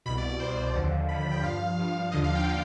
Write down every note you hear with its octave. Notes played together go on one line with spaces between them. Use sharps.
C2 B2 B5
D5
D5
C2 B2 C5
D#2 D3 F3
D#2 D3 F3 B5
B5
G5
G2 F3 F5
G2 F3
D#2 D3 F3 D#5
F5
G5
D3 F3